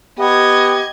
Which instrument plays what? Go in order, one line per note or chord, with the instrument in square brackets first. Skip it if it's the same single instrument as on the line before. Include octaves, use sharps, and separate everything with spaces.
[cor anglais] B3 [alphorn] G4 [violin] D#5 G#6